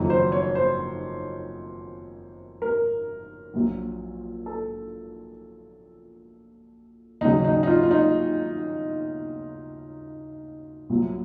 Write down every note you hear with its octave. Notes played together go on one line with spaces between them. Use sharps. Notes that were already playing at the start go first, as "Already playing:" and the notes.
Already playing: F#1 F2 D#3 F#3
C5
C#5
C5
A#4
A#1 A#2 F#3
A4
D#2 C#3 F#3 D#4
D#4
D#4
F4
F4
D#4
C2 A#2 F#3